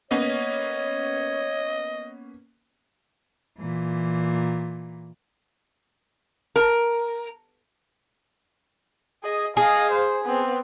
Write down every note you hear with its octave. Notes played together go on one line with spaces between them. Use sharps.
A#3 B3 C#4 C#5 D#5
A#2 E3
A#4
G#4 D#5
G#4 D#5 F5
C5
B3 C4